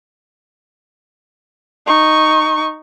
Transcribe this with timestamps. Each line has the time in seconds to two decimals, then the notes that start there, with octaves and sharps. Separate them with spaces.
1.86 D#4 C#6